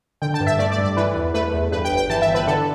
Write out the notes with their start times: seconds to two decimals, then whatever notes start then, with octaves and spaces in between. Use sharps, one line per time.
0.22 D3 G5
0.34 A5
0.40 G2
0.47 E5
0.59 A3 D5
0.72 D5
0.78 G2
0.84 D5
0.97 E3 B4
1.16 E2
1.34 A3 B4
1.53 E2
1.71 G2 B4
1.85 G5
1.91 G1
1.97 G5
2.10 E3 A5
2.22 E5
2.28 G1
2.35 B4
2.47 D3 A4